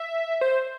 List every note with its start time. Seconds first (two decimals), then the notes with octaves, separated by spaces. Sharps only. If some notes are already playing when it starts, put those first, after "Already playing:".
Already playing: E5
0.41 C5